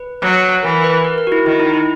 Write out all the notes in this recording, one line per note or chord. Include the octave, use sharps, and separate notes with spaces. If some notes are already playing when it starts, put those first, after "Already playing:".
Already playing: B4
F#3
E3 A#4
B4
A#4
A#4
F#4
E4
D#3 E4
D#4
E4